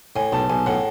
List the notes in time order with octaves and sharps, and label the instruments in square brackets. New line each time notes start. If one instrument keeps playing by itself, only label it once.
[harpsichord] A2 [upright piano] G#5
[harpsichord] B1 [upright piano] A5
[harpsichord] B1 [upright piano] G#5
[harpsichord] A2 [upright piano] F#5